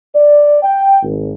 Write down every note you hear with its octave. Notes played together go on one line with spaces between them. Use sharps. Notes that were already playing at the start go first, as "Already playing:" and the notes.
D5
G5
G#1